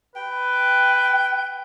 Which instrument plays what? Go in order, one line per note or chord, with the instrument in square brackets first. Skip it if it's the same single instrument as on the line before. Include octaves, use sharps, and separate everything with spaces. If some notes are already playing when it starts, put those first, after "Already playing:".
[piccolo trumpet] B4 [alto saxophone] G5